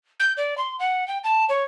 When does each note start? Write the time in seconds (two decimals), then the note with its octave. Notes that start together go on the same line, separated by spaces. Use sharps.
0.20 G6
0.37 D5
0.58 C6
0.79 F#5
1.08 G5
1.24 A5
1.49 C#5